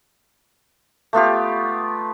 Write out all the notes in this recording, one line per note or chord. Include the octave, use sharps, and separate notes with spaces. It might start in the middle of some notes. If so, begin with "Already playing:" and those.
A3 B3 F4 G4